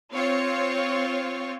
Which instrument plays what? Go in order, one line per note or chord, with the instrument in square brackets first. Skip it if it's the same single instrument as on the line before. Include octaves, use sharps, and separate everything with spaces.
[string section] C4 F4 C#5